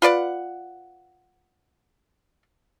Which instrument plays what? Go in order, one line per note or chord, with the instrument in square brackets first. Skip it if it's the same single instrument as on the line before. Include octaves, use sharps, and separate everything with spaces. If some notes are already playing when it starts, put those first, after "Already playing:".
[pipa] F4 B4 D5 F#5